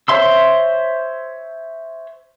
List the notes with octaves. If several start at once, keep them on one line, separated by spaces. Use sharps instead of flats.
C5 C#5 E5 C6 E6